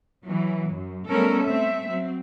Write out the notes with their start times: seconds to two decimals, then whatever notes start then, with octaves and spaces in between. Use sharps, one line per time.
0.24 E3 F#3
0.74 F#2
1.10 G3 A3 B3 C#4 A4 A#4
1.46 A3 C4 E5
1.87 F#3 C4